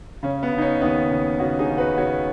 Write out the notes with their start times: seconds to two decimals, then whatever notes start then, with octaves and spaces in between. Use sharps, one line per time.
0.23 C#3 C#4
0.43 B3
0.53 C#3
0.58 D#4
0.62 C#4
0.81 D#2 B3 D#4
1.11 C#3
1.39 C#3 C#4 F#4
1.59 D#4 G#4
1.68 C#3
1.77 F#4 B4
1.97 C#3 C#4 F#4